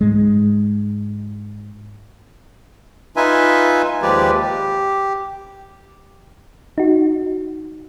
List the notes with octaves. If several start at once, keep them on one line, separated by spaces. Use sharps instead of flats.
G#2 G#3
D#4 F4 B4 E5 G#5
D#2 F3 G#3 G4 B4 D5
G4
D#4 F#4